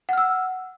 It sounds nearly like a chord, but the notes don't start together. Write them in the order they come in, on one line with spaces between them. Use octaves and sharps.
F#5 F6 E6